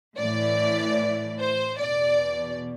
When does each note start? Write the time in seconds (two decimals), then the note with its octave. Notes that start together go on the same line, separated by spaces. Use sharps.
0.17 A2 E3 D5
1.39 C5
1.79 E2 B2 D5